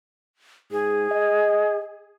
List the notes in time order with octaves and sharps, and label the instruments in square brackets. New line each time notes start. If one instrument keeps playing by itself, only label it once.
[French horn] G#2 [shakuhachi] G#4
[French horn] D#5